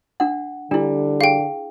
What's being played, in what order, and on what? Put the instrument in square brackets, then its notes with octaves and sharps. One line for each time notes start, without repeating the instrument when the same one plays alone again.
[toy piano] D4 F#5
[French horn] D3 [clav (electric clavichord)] G3 [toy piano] D4 E4
[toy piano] G#4 [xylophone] F5 G5